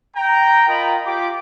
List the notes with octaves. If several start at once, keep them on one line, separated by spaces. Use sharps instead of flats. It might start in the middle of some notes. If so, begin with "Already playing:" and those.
G5 A#5
F4 A#4 D#5 G5 A#5 B5
F4 G4 D6